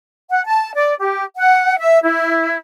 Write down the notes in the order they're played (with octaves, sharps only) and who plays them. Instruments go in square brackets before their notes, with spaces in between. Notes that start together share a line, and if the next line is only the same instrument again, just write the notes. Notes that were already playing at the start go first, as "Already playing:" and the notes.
[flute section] F#5
A5
D5
G4
F#5
E5
E4